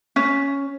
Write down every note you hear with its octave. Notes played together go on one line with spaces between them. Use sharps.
C#4